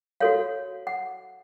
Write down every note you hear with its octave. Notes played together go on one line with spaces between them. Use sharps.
F#4 A4 C#5 F5
F#5